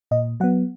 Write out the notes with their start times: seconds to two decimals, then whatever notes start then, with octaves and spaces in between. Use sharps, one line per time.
0.11 A#2 D#5
0.40 F#3 B3 F#5